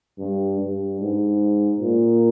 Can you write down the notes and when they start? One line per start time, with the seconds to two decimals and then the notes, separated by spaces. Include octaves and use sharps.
0.19 G2
0.60 G2
1.01 G#2
1.80 A#2